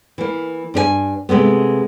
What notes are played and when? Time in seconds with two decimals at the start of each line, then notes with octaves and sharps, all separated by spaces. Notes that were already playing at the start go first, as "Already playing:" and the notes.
0.18 E3 A#3
0.74 G2 D4 B4 G#5
1.29 C3 G#3 A3 B3